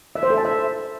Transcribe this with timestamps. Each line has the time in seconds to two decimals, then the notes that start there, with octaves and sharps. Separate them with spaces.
0.15 E5
0.23 C5
0.30 A4
0.38 A5
0.45 E5